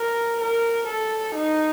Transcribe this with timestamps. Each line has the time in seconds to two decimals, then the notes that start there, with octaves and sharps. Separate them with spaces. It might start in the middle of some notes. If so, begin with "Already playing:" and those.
Already playing: A#4
0.41 A#4
0.87 A4
1.35 D#4